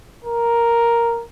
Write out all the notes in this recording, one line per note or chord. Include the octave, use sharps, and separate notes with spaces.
A#4